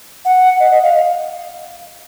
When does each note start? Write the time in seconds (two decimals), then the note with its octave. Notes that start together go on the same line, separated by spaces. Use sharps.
0.25 F#5
0.60 D#5
0.71 D#5
0.83 F5